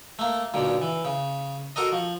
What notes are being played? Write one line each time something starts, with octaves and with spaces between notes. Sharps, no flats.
A3 A#3
B1 A#2 D3
E3
C#3
F#4 A4 A#4 D#5
F3